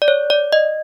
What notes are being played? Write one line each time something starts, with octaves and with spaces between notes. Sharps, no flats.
D5
C#5
D5
D#5